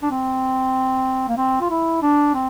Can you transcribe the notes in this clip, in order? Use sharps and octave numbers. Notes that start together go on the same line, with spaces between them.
D4
C4
A#3
C4
F4
E4
D4
C4